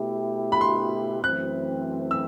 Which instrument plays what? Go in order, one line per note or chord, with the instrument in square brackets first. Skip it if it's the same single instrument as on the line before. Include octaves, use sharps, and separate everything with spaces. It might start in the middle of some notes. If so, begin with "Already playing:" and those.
Already playing: [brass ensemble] B2 A3 E4 G4
[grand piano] B5
C6
[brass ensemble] F#2 E3 A3 C4 [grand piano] F#6
[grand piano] E6